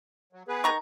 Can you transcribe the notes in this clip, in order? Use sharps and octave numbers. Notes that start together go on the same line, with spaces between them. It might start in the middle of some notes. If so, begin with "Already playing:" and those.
F#3
B3 G#4 B4
D#3 A#5 C#6